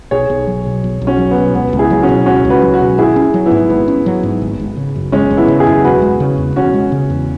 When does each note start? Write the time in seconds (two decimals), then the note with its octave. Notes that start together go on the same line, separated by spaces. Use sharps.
0.11 B1 G#4 C#5
0.30 B1
0.47 F#3
0.66 B2
0.84 B1
1.02 B1
1.07 C#4 F#4
1.19 F#3
1.31 B3
1.38 B2
1.55 C#2 B3
1.73 C#2
1.79 E4 G#4
1.90 F#3
2.03 C#4 F#4
2.09 B2
2.26 C#2 C#4 F#4
2.45 C#2
2.50 F#4 B4
2.62 F#3
2.74 F#4 B4
2.80 B2
2.98 G#1 E4 G#4
3.16 C#4
3.34 F#3
3.46 B3 E4
3.51 G#2
3.69 G#1 B3
3.88 C#4
4.06 F#3
4.23 G#2
4.42 G#1
4.59 G#1
4.77 C#3
4.96 F#2
5.12 G#1 G#3 C#4
5.31 G#1
5.37 B3 E4
5.48 C#3
5.60 E4 G#4
5.67 F#2
5.84 E1 F#4 B4
6.02 G#3
6.20 C#3
6.38 E2
6.56 E1 C#4 F#4
6.74 G#3
6.92 C#3
7.10 E2